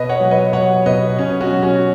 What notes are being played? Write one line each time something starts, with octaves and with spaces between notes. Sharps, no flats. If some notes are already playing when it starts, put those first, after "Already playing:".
Already playing: B2 B4 D#5
C#5 F#5
F#3
B4 D#5
F#3 C#5 F#5
B2 B4 D#5
B2 C#4
C#4 F#4
F#3
C#4 F#4